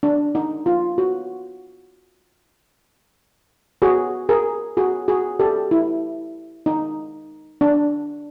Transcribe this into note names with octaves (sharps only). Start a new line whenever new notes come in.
D4
D#4
F4
F#4
F#4 G#4
G#4 A#4
F#4 G#4
F#4 G#4
G4 A4
E4
D#4
D4